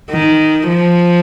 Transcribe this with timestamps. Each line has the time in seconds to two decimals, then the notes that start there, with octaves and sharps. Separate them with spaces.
0.10 D#3
0.68 F3